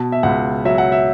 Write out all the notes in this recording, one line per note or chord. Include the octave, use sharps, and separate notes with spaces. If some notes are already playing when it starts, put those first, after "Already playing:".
Already playing: B2 A5
E5
C#2 F#5
F#3 E5
F#5
E5